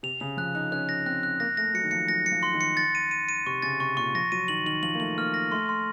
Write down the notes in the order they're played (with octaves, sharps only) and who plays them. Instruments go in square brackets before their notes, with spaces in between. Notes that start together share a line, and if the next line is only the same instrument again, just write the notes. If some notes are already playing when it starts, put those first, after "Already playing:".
[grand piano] C3 [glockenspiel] F7
[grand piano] C#3 [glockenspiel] F7
[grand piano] F3 [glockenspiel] F#6
[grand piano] D#4 [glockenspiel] F#6
[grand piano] C#4 [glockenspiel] F#6
[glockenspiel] A#6
[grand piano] C4 [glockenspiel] F#6
[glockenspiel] F#6
[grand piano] A#3 [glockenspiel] A#6
[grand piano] A3 [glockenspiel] A#6
[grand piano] F#3 [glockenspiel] C#7
[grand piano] D#3
[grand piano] F3 [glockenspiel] C#7
[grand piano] F#3 [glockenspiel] A#6
[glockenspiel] C#7
[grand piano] F3
[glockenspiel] C6
[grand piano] D#3
[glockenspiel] C#7
A6
D#7
D#7
D#7
[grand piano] C3 [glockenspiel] C#6
[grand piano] C#3 [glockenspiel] A6
[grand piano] C3 [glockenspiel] C#6
[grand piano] A#2 [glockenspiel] C#6
[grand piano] F3 [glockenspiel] A#6
[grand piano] F#3 [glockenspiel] D#7
[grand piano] D#3 [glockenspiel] F#7
[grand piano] D#3 [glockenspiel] F#7
[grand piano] F3 [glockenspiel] F#7
[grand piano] A#3
[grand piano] A3 [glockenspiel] F#7
[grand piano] A#3 [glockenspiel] F6
[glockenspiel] A#6
[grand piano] A3 [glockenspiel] C6
[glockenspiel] C6